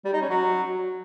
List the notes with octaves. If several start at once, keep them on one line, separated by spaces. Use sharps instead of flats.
G3
D#4
C#4
F#3